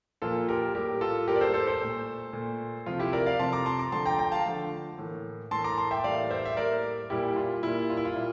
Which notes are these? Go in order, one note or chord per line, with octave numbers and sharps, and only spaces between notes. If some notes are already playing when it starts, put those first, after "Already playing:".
A#2 F3 A#3 F4 A4
G4 A#4
A2 G3 A#3 G4 A#4
F4 A4
A2 G3 A#3 G4 A#4
D5
A4 C5
A4 C5
A4 C5
A#2 A3
A#2 A3
C3 F3 A3 F4
E4 G4
A#4 D5
D5 F5
C3 F3 A3 A5 C6
A#5 D6
A5 C6
A#5 D6
D3 F3 A3 A5 C6
G5 A#5
G5 A#5
F5 A5
D3 F3 A3
A2 E3 A#3
A2 E3 A#3 A5 C6
A#5 D6
A5 C6
E5 G5
A2 G3 A#3 D5 F5
C5 E5
E5
A2 G3 A#3 A#4 D5
A#2 G3 A#3 E4 G4
F4
A#2 G3 A#3 E4
F4
E4
F4
A#2 G3 A#3